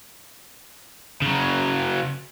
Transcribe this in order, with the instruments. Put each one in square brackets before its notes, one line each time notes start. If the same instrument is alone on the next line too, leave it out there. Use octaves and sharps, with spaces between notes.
[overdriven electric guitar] C#3 F#3